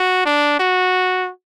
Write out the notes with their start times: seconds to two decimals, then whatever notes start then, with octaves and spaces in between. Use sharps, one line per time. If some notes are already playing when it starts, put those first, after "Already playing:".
Already playing: F#4
0.25 D4
0.59 F#4